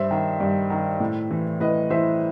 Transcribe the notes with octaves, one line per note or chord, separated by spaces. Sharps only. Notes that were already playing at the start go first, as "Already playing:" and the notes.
Already playing: G2 C5 E5
D#3
G2
D#3
A2
E3
A2 B4 D#5
E3 C5 E5